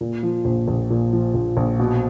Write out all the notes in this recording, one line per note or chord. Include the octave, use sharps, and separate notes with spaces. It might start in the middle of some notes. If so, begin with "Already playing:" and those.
A#2
F3
A#1
A#1
A#2
F3
A#1
A#1
B2